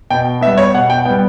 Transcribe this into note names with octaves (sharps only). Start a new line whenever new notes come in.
B2 G5
G3 B3 E5
C#5
B2 F#5
G5
G3 B3 G5